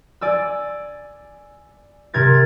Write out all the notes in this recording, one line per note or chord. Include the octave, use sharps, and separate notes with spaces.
D5 G#5 E6
C3 A#4 G#6 A6